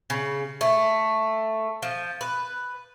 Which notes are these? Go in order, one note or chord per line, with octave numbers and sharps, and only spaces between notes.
C#3
A3
F3
B4